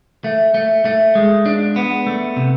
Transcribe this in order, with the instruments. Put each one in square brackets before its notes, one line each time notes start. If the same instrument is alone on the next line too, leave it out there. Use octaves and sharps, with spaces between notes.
[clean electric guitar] A3
A3
A3
G#3
D4
B3
A3
C3